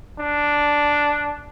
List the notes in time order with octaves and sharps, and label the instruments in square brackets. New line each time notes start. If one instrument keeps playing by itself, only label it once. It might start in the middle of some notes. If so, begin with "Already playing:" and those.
[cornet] D4